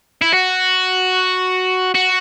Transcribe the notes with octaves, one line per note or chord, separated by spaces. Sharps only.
E4
F#4
F#4